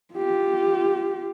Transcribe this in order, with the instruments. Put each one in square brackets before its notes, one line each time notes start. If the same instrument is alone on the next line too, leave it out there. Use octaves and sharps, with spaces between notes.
[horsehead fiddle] F4 G4